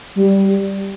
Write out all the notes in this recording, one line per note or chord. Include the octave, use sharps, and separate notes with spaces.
G3